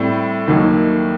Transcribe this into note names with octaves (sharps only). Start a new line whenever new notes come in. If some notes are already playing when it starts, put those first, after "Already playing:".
Already playing: A2 G3 C4
D#2 D#3 F#3 A#3